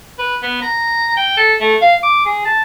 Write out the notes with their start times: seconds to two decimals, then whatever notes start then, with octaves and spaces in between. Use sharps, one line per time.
0.19 B4
0.42 B3
0.62 A#5
1.17 G5
1.37 A4
1.60 A3
1.81 F5
2.03 D6
2.25 G#4
2.45 A5